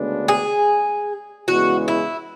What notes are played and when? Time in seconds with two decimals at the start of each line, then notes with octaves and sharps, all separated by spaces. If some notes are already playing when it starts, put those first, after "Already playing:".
Already playing: D2 C#3 G#3 B3 D4
0.28 G#4
1.48 E2 C#3 E3 G#3 F#4
1.88 E4